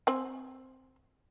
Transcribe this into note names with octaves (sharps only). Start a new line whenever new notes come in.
C4 G#5